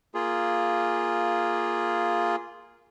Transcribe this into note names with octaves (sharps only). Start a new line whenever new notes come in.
A#3 F4 G#4